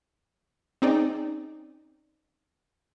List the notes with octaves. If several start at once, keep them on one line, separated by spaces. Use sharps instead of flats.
C4 C#4 D#4 G#4 D5 G5